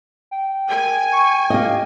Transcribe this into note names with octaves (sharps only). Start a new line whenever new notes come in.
G5
A#4 G#5
C#6
G4 D#5 F5